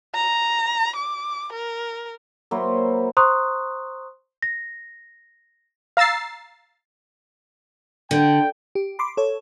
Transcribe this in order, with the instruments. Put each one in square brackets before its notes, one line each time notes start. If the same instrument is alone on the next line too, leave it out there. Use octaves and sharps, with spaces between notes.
[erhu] A#5
D6
A#4
[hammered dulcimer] F#3 A#3 E4 C5
[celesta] C5 A#5 C6 C#6 D#6 F#6
A#6
[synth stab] F5 A#5 E6 A6 C7
[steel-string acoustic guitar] D3 [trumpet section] G5
[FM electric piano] G4
B5 C6 D6
A4 C#5